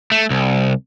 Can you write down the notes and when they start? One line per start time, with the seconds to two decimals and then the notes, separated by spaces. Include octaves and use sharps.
0.12 A3
0.30 C2